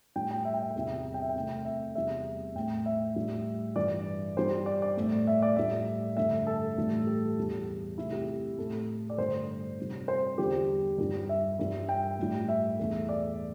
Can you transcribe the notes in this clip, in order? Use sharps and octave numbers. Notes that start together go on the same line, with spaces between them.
A2 G3 G5
G5
E5
G5
E5
G5
E2 C3 G3 E5
G5
E5
G5
C3 A3
E5
E2 C3 G3 E5
A2 A3 G5
E5
A2 G3
G2 E3 G3 D5
G2 G3 C5
D5
D5
A2 A3
E5
D5
A2 G3 E5
G2 D3 A3 E5
A4
A2 E3 G3
G4
E2 E3 G3
C3 A3 E4
G4
A2 A3 A4
D5
G2 D3 A3 C5
C3 G3
C5
E2 D3 G3 G4
G2 G3
E5
G2 G3
G5
A2 G3
E5
E2 E3 A3
D5